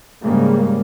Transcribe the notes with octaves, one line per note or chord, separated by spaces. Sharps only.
G#2 C#3 G3 G#3 A#3